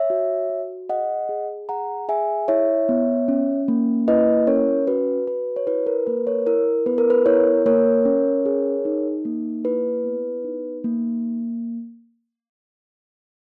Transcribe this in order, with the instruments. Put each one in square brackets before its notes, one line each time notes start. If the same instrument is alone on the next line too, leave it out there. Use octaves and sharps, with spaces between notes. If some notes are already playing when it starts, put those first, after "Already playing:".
Already playing: [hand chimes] C#5 E5
F#4
F#4
G#4 D#5 F#5
G#4
G#4 F#5 A#5
G#4 E5 G#5
E4 C#5 E5
B3
C#4
A#3
E4 B4 D#5
C#4 A#4 C#5
F#4 B4
F#4 B4
C#5
E4 B4
A#4
A#3 B4
A#4 C#5
E4 A#4
B3 B4
A#4
B4
E4 A#4 C#5
A#3 A#4 C#5
C#4
G#4
D#4
A#3
E4 B4
B3
D#4
A#3